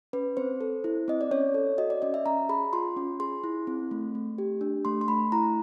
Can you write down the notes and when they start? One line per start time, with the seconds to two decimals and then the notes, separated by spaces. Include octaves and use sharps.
0.13 C#4 B4
0.37 C4 C5
0.61 A4
0.84 E4
1.08 C4 D#5
1.21 D5
1.31 C#4 C#5
1.54 A4
1.78 F#4 D#5
1.90 D5
2.02 C#4 D#5
2.14 E5
2.26 C#4 A#5
2.49 G#4 B5
2.73 F4 C6
2.97 C#4
3.20 G#4 C6
3.44 E4
3.67 C4
3.91 A3
4.15 A3
4.38 G4
4.61 D4
4.85 A3 C6
5.01 C6
5.08 A3 B5
5.32 E4 A#5